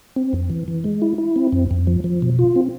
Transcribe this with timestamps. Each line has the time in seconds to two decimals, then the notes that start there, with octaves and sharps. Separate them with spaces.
0.16 C4
0.33 F2
0.50 E3
0.68 E3
0.84 G#3
1.02 E4
1.18 E4
1.36 C4
1.52 F2
1.71 F2
1.87 F3
2.04 F3
2.22 B2
2.39 F4
2.56 C4